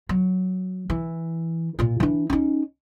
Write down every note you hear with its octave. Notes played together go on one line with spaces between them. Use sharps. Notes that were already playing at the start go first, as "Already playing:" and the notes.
F#3
E3
A#2 F4
E3 D4
C#4 D#4